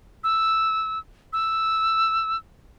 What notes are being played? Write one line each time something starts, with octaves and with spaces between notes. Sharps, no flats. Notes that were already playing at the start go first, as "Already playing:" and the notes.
E6
E6